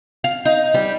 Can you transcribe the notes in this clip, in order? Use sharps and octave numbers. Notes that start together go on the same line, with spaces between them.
F5
D#4
G3